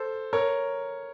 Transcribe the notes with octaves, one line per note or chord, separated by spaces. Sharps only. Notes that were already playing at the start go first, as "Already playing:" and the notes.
Already playing: A4 C5
A#4 C#5